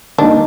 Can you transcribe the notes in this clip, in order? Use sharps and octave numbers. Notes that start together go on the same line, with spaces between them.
D#3 G3 A#3 D4 D#4 G4